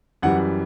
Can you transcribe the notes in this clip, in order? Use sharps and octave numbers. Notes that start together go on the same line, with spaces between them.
F#2 E3 G3 F#5